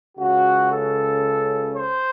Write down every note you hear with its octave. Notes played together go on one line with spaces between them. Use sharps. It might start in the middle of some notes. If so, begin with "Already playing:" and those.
C#2 C#3 F#4
A4
C5